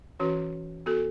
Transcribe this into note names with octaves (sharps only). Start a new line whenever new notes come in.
E3 C#4 F#4 B4
B3 F#4 A4